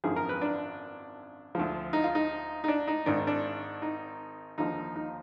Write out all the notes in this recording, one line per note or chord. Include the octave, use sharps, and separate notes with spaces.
G#1 F#2 D3 F3 G#4
A#4
B4
D4
D2 D3 F3
D#4
F4
D#4
D#4
D4
D#4
G#1 G#2 D#3 D4
D4
D#4
D#2 D3 F3 D#4
D#4